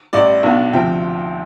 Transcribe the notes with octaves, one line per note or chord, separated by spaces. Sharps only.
A1 A2 G3 D5
B1 B2 B3 D4
D2 C3 F3 C4 G5